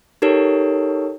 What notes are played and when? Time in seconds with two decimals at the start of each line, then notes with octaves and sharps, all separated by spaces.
0.22 D#4 G4 A4 A#4 C#5